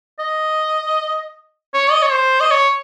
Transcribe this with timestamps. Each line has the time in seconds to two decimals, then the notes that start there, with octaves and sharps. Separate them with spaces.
0.19 D#5
1.74 C#5
1.91 D#5
2.02 C#5
2.12 C5
2.40 D#5
2.51 C#5